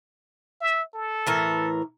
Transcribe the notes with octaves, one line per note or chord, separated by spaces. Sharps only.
E5
A4
A2 E3 A#4